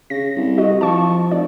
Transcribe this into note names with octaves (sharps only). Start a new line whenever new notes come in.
C#3 A#6
C2
F#4 D#5
F3 A5 C#6
F1 D5